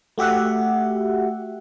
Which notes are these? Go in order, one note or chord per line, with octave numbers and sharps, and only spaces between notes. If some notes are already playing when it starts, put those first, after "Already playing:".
A3 F#4 G4 E5 F#5